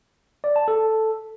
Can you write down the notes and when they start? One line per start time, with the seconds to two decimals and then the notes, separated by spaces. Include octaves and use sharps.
0.44 D5
0.56 A5
0.68 A4